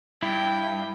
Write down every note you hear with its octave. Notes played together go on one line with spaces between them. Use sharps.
G2 E4 G5